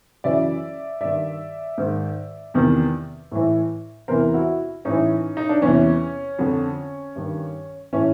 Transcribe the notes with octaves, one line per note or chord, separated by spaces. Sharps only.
F#2 C#3 E3 D5 E5
G2 D#3 D5 E5
G#2 D#3
E2 C3 D#3
A2 E3
E2 C3 E3 A#4 C5
E4 F#4
A2 E3 C#4 D#4
D#4
D4
E2 C3 E3 C#4
F2 D3
G2 D#3
A2 E3 C#4